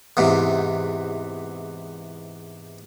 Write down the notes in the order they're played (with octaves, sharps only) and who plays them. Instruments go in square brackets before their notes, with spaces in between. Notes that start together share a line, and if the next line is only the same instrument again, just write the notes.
[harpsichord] E2 G#2 C3